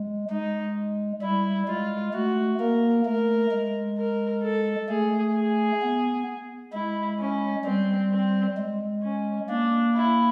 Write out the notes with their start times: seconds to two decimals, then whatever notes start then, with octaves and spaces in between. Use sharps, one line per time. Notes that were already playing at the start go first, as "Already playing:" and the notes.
Already playing: G#3
0.30 G#3 D#4
1.22 G3 E4
1.68 G#3 F4
2.13 A3 F#4
2.59 A#3 A#4
3.06 A3 A#4
3.51 G#3
3.98 A#4
4.43 A4
4.89 A3 G#4
5.35 G#4
5.82 B3
6.73 G#3 E4
7.19 C#4
7.65 G3 C4
8.11 C4
8.57 G#3
9.03 C#4
9.49 A#3 D4
9.95 E4